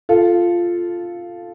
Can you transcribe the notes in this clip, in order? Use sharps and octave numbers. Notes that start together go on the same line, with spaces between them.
F4 A4